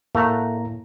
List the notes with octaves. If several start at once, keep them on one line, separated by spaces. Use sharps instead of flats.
A2 A3 A#3 F#5 A#5